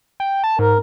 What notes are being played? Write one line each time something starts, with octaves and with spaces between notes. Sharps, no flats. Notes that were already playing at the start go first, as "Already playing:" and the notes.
G5
A5
G#2 A#4